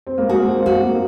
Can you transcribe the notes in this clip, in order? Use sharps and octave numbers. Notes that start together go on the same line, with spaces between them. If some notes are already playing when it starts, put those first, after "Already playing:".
C4
A#3
G#3 F#4
A#3
C4
A#3 F#4
A#3